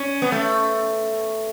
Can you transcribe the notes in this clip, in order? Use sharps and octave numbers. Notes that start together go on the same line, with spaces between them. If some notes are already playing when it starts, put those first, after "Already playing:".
Already playing: C#4
B3
A3